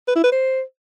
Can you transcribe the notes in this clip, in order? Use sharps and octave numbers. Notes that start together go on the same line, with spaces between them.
B4
E4
B4
C5